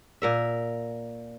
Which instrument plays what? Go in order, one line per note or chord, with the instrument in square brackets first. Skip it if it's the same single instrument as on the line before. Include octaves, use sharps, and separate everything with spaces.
[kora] A#2 A#4 E5